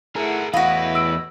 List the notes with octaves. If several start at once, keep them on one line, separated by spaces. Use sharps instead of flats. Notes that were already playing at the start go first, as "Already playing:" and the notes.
A3 E4 G#4 A#4 F#5
E2 A2 E4 F#4 B4 D#5 F5 B5
E6 D7